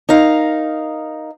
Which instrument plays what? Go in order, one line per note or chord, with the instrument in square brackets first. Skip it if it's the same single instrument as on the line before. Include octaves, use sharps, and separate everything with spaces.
[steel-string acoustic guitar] D#4 A#4 F5